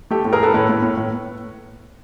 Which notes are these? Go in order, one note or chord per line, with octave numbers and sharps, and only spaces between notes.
A3 G4 A4
A2
G#4 A#4
A3 A4 B4
A2 B4 C#5
A2
A2
A2